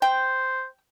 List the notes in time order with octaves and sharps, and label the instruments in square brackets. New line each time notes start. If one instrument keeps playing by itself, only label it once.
[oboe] C5 [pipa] G5